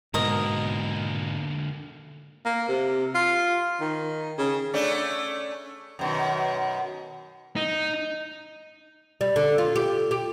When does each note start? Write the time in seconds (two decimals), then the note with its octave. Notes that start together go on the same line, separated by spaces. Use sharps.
0.14 G#2 B2 D3 A#3 A#4 D#5
2.45 A#3
2.69 C3
3.15 F4
3.81 D#3
4.38 C#3
4.74 A3 C#4 D4
5.99 F#2 B2 D#3
7.56 D#4
9.21 G3
9.36 D3
9.58 F4
9.76 G4
10.11 G4